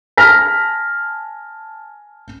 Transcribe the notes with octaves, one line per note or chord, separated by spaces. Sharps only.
G#5 A5 F6 A#6 B6